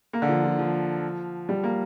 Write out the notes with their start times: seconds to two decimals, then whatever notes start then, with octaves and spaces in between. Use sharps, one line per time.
0.13 A#3
0.22 D3
0.29 F3
0.44 F3
0.59 F3
1.49 G3
1.63 A#3